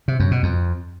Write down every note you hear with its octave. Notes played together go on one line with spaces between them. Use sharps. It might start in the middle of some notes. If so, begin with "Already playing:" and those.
C3
F#2
B2
F2